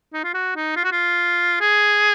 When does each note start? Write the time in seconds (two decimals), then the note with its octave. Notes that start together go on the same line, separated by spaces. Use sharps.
0.14 D#4
0.24 F4
0.34 F#4
0.56 D#4
0.76 F4
0.84 F#4
0.92 F4
1.61 G#4